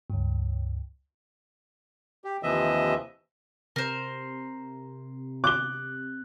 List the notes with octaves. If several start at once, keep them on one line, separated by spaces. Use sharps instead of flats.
C#2 G2
G4
D#2 C3 E3 F3 D#5 E5
C3 A#4 C5
D6 F#6 G7